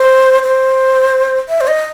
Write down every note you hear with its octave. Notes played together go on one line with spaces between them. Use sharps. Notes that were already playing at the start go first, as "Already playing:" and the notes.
Already playing: C5
C5
E5
C5
D#5